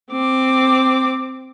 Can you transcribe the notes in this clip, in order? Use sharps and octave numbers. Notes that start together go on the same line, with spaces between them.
C4 D6